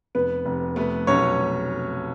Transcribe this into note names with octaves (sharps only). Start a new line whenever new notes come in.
F1 B3 B4
F1
A3 B3 B4
B1 C#4 C#5